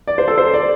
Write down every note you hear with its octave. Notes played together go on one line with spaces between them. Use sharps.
D5
C5
A4
C5
D5